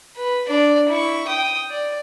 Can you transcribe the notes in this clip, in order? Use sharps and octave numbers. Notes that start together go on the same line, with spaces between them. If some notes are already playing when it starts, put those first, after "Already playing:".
B4
D4 D5
E4 C#6
G5 D#6
D5